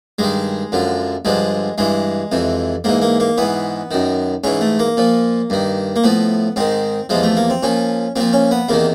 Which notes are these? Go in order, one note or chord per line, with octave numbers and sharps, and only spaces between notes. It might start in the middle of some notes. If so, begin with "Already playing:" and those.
G2 D#3 G#3
F#2 D3 F3
G2 D3 F3 G#3
G2 E3 G#3
F2 C3 E3
G#2 E3 A#3
A#3
A#3
G#2 E3 B3
F#2 D#3
G#2 E3 C#4
A3
A#3
A#2 F3
G2 D#3
A#3
A2 F3 B3
G#2 D#3 C4
E2 C3 F3 G#3
A3
A#3
C4
A#2 F3 C#4
A#2 F3 C4
C#4
B3
E2 C3 D#3 A#3